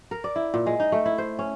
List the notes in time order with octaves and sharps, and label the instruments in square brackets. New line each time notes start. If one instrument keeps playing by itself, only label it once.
[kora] A#4
D5
E4
A#2
G#3
D#4
A3
E4
C5
C#4